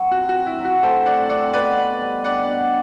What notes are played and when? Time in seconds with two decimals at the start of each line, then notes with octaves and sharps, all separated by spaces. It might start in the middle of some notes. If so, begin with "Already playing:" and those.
Already playing: F#3 C4
0.11 C3 F#4
0.29 F#4
0.35 C4
0.46 E4
0.59 F#3
0.65 F#4
0.83 A3 A4 C5
1.06 C3 D5 F#5
1.29 C4 D5 F#5
1.53 B2 B4 D5
1.77 B2
2.01 G3
2.24 D4 D5 F#5
2.49 B2